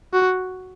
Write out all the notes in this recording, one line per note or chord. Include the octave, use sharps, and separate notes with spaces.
F#4